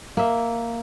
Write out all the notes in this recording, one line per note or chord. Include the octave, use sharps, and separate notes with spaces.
A#3 E5